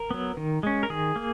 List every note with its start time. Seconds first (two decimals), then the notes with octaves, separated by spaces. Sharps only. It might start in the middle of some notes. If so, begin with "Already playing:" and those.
Already playing: A#4
0.11 F#3 B3
0.37 D#3
0.63 G#3 C#4
0.83 A#4
0.90 D#3 G#4
1.16 A#3